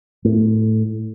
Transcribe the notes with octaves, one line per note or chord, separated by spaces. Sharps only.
A2